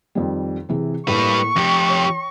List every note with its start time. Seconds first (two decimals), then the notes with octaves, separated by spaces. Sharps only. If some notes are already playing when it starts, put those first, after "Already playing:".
0.15 F2 D#3 G3
0.69 C3 E3 G#4
1.08 A2 G3 A#3 B4 C#6
1.56 F2 G4 A#6
1.88 C#5 G5